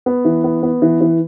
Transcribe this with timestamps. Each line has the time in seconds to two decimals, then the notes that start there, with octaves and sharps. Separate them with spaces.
0.06 B3
0.25 E3
0.44 B3
0.63 B3
0.82 E3
1.01 E3